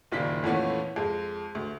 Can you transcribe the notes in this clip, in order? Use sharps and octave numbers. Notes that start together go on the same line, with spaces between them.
F#1 A#2 D#3 A#3 D5 B6
F2 A#2 E3 A3 B3 C#4
F2 G#3
D2